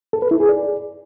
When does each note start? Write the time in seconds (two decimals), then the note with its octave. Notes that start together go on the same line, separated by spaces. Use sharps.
0.13 A4
0.22 B4
0.31 E4
0.40 G#4
0.49 D5